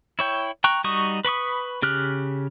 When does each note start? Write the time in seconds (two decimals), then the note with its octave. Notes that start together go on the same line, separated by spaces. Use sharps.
0.19 E4 C#5 G5
0.64 G5 A#5 C#6 F#6
0.84 G3 D#4 F#4 C#6 D#6
1.25 B4 B5 C#6 D#6
1.82 C#3 G4 F6 F#6